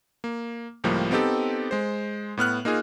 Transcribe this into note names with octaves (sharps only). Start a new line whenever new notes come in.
A#3
C#2 A2 F3 G3 A#3
B3 C4 D#4 G4 A4
G#3 C5
A2 B3 F6 F#6
A#3 D#4 F4 G#4